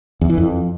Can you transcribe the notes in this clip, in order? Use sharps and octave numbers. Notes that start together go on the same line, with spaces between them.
E2
E3
F2